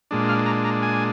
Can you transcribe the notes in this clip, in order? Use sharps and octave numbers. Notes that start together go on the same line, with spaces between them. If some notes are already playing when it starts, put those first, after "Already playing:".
A#2 G#3 D4
F5
A#5
A#5
G#5